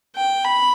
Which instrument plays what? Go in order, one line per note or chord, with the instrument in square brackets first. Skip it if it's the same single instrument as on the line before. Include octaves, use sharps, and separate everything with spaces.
[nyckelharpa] G5
B5